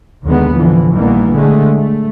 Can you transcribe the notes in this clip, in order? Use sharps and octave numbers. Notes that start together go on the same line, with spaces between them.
D#2 B2 D3 D#3 G#3 B3
A2 D3 E3 F3
A#1 D#3 E3 G3 A#3 B3
D3 G#3 A3
A3